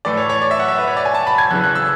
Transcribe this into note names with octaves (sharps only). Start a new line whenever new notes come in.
A2 E3 A3 D5
C#5
C#5
D5
E5
F#5
E5
B4
C#5
D5
G#5
A5
B5
G#6
E2 C#3 E3 F#6
F#6
E6